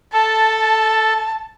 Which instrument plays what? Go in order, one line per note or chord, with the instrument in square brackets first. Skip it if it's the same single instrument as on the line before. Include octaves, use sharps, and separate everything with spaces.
[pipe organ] A4 [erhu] A5